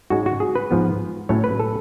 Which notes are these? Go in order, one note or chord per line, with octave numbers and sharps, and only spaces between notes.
G#2 G#3 C#4 F#4
F#4
G#4
B4
G#2 F3 B3
A2 F#3 A3 C#4 C#5
B4
A4